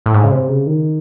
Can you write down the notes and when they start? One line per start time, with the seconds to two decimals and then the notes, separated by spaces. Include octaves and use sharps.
0.06 A2
0.14 G#2
0.24 C#3
0.31 C3
0.49 C#3
0.67 D#3